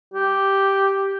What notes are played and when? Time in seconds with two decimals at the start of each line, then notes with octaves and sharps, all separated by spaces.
0.14 G4